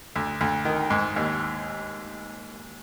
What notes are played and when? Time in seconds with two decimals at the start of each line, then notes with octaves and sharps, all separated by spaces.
0.16 D2
0.41 D2
0.65 D#3
0.90 G#2
1.16 D#2